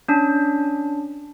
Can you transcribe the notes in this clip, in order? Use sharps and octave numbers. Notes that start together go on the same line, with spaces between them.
C#4 D4